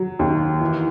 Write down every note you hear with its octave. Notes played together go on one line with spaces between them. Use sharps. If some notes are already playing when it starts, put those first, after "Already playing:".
Already playing: F#3
D#2
E3